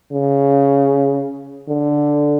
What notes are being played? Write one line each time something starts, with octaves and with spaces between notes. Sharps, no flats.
C#3
D3